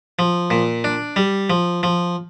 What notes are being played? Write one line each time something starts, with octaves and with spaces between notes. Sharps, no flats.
F3
A#2
D4
G3
F3
F3